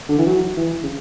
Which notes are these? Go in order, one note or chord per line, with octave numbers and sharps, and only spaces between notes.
D3
E3
F#3
E3
C#3